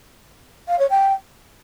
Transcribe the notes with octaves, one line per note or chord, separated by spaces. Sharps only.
F5
C#5
G5